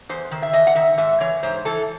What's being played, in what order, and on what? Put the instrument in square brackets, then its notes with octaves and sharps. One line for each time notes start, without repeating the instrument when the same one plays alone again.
[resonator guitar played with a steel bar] E2 C5
D#3
E5
E2 D#5
F#5
D#3 E5
G#2 E5
E3 C#5
G#2 C5
E3 A4